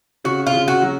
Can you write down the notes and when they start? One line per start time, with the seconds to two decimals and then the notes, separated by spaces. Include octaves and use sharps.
0.24 C#3 F#4
0.47 F4
0.54 C#3
0.68 F#4
0.82 F#3